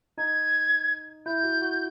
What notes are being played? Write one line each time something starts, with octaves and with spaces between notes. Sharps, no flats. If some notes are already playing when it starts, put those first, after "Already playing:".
D#4 G#6
E4 G6
F#4
F#4